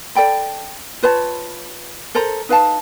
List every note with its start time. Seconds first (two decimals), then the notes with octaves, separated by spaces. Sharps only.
0.15 A4 D5 G5 B5
1.02 F4 B4 C#5 A5
2.15 A4 A#4 C5 A#5
2.49 D#4 B4 F5 A5